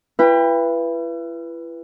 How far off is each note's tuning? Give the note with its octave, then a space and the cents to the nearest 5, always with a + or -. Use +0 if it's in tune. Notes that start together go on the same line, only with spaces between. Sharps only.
E4 +40 B4 -5 G5 +30